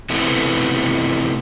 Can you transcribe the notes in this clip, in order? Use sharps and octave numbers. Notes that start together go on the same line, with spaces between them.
C3 E3 A3 B3